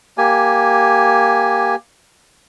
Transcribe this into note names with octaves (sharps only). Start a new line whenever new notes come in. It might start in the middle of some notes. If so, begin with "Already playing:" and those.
A#3 G4 G#5